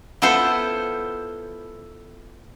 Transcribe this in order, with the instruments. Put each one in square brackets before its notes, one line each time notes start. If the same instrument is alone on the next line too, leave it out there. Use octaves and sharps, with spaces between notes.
[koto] B3 E4 F4 A4 C5